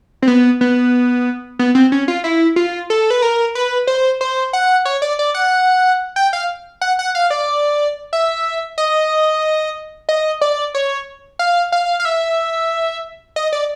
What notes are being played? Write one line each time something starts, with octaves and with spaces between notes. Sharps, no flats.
C4
B3
B3
B3
C4
C#4
F4
E4
F4
A4
B4
A#4
B4
C5
C5
F#5
C#5
D5
D5
F#5
G5
F5
F#5
F#5
F5
D5
E5
D#5
D#5
D5
C#5
F5
F5
F5
E5
D#5
D5